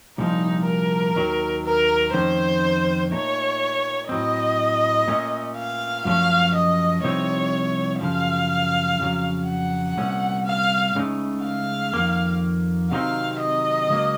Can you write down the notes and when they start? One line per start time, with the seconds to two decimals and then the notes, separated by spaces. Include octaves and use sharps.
0.18 C2 A#2 F3 D#4
0.67 A#4
1.15 D#2 D#3 F#3
1.65 A#4
2.14 F2 D#3 A3 C#4 C5
3.11 A#2 A3 D#4 C#5
4.09 A2 F#3 C4 D#5
5.08 A#2 A3 C#4
5.56 F5
6.05 F#2 F3 A3 C#4 F5
6.55 D#5
7.04 C2 C3 F3 C4 D#4 C#5
8.01 F#2 C#3 F3 F5
9.00 F2 C#3 F#3
9.48 F#5
9.97 C2 A#2 A3 C#4
10.46 F5
10.95 C#2 C#3 A3 D#4
11.44 F5
11.94 F2 D#3 A#3
12.91 C3 D#3 F#3 C4 D#4 F5
13.40 D#5
13.89 C#2 C#3 F#3 A#3